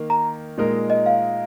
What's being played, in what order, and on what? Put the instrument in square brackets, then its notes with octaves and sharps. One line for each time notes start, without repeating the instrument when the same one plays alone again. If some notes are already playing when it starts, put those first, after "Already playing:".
Already playing: [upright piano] D#3 A#3
[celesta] A#5
[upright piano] A#2 G#3 D#4 A#4
[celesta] D#5
F5